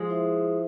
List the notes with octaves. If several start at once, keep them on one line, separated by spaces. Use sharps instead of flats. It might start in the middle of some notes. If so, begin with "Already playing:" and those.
Already playing: F3 G#3
E4 G#4 C5 E5